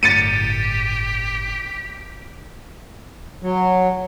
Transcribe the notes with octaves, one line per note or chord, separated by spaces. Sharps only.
G1 A2 G4 A6 C#7 D#7
F#3